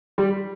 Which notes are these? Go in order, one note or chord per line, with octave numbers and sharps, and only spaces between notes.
G3